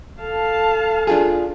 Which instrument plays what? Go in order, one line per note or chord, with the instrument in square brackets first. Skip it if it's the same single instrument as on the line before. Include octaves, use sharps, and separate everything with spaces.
[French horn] A4 [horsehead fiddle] F5 A5
[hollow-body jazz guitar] D4 F4 G#4